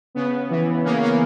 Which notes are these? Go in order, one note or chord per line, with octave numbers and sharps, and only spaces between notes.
C#3 B3
E3
C#3 A#3 C#4
A#3 C#4